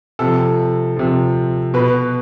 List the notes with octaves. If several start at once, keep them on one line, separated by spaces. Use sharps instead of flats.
C3 F3 A4
C3 F3
B2 B4